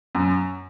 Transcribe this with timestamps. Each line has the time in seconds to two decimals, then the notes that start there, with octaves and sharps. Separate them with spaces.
0.15 F#2